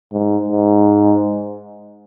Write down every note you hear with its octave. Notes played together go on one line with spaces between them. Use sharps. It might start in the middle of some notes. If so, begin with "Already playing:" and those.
G#2
G#2